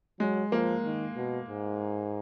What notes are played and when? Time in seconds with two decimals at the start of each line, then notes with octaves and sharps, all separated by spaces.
0.20 F#3 G#3
0.52 F3 A#3
0.84 D#3
1.17 B2
1.49 G#2